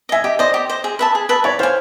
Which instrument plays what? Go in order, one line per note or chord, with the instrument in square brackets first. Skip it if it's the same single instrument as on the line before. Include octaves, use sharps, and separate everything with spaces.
[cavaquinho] D#5 G#5 [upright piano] E5
[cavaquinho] G4 [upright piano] D#5
[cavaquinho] C5 D#5 [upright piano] D5
[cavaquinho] G4
C5 D#5
G#4
B4 E5 A5
G#4
B4 E5 A5
[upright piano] C#5 [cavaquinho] D5
[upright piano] C5 [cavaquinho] F5 G#5